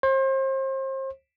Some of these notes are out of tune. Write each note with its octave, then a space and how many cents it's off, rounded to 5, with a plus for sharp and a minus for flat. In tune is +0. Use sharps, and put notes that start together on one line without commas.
C5 +35